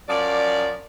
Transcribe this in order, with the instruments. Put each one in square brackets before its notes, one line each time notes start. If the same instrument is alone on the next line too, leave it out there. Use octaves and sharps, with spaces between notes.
[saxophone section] F#2 F3 D5